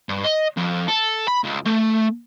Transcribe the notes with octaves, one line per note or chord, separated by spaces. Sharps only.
G2
D#5
F2
A4
B5
C#2
A3